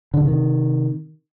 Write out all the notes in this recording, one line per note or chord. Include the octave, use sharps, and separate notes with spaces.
D3
C3 D#3